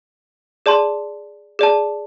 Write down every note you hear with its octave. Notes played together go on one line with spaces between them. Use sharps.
G#4 D5 A5 C6
G#4 D5 A5